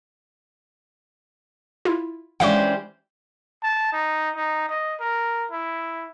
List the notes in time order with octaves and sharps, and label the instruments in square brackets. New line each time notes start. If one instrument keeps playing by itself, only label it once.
[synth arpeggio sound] E4 F4
[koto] E3 G4 C5 [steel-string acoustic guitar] G#3 C#4 D4 [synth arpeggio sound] F5 C#6
[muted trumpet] A5
D#4
D#4
D#5
A#4
E4